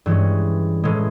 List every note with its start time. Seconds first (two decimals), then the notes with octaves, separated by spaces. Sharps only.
0.06 G2 E3 G#3 C#4
0.84 A2 E3 G#3